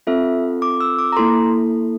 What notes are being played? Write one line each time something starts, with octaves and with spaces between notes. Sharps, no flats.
C4 F4 A4 E5
D6
E6
D6
A#5
A#3 E4 A4 C6